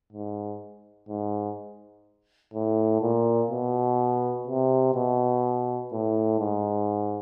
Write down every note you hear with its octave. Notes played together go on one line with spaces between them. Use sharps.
G#2
G#2
A2
A#2
B2
C3
B2
A2
G#2